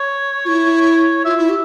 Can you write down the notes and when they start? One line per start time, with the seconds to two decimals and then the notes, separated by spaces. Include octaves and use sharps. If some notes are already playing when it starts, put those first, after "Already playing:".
Already playing: C#5
0.45 F4
0.48 E4
1.25 F4 E5
1.37 E4
1.49 G4